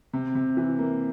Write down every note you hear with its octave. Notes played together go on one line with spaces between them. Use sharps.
C3
C3
E3
A#3